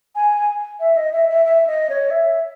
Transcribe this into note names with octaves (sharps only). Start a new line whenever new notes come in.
G#5
E5
D#5
E5
E5
E5
D#5
C#5
E5